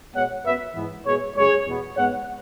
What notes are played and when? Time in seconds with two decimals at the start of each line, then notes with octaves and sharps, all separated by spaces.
0.14 B2 G#3 B3 C#5 F#5
0.45 F#2 F#3 B3 B4 E5
0.75 G#2 E3 B3
1.05 B2 G#3 B3 G#4 C#5
1.35 F#2 C#3 G#3 G#4 C#5
1.66 E2 B2 B3
1.96 G#2 G#3 B3 C#5 F#5